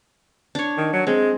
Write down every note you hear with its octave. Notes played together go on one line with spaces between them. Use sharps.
D4 C#5
D#3
F#3
G#3 C4